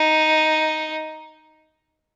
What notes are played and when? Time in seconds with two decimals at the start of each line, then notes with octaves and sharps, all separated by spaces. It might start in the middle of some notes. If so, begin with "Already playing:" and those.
Already playing: D#4